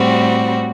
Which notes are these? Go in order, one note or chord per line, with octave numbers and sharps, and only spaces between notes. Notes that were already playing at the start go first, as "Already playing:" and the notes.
Already playing: A2 G3 C4 F#4